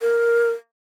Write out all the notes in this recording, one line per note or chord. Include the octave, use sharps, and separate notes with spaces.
A#4